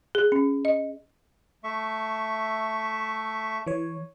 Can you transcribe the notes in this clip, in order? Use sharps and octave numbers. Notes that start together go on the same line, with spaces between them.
G#4
C#4
D#5
A3 E5 C#6
E3 C#5